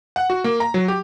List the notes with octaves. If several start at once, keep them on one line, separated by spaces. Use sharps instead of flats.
F#5
F#4
A#3
A#5
F#3
G4